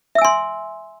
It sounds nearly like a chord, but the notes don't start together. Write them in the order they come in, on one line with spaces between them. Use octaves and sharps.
E5 E6 G#5 C6